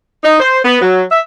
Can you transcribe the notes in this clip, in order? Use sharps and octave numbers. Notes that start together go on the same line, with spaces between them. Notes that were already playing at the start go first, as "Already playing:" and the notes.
D#4
C5
B3
F#3
E5